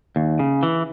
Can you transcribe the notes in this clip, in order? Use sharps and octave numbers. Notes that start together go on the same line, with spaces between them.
D#2
C#3
E3